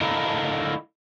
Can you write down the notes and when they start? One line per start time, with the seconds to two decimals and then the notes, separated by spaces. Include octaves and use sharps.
0.01 D4 E4 A4 A#4 D#5 F5